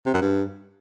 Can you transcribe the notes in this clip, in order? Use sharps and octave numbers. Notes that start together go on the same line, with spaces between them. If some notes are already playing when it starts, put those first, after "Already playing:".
C3
F#2
G2